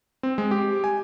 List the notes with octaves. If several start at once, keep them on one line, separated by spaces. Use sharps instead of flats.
C4
G#3
G4
G#5